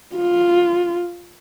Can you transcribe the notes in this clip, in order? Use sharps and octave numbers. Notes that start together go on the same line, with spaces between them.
F4